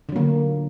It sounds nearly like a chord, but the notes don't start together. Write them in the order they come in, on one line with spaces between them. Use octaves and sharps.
D3 F#3 A#3